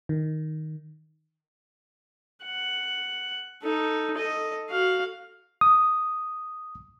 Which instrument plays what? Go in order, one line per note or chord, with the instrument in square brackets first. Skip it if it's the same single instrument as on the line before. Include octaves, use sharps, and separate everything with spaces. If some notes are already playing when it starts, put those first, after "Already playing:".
[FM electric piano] D#3
[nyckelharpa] F#5
D#4 A4
A4 D#5
F#4 F5
[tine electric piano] D#6